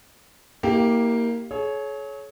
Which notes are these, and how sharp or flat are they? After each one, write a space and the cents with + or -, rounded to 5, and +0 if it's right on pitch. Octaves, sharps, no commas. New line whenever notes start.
A#3 +0 E4 -35 G4 +0
G#4 +45 C#5 +0